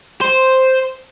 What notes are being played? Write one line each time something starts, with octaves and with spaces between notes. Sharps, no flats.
C5